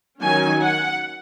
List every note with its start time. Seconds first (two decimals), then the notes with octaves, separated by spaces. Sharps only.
0.20 D#3 F#3 C#4 G#5
0.62 F#5